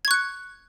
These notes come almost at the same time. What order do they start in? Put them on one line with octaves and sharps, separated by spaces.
G#6 C#6 F#6 C#7